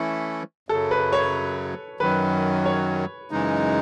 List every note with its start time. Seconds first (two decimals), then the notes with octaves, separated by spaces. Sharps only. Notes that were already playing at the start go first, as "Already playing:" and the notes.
Already playing: E3 A3 C#4 E4 A4
0.69 F#2 C#3 F#3 A4
0.91 B4
1.13 C#5
2.00 F#2 D#3 F#3 B4
2.66 C#5
3.31 F#2 C#3 E3 G#3 D#4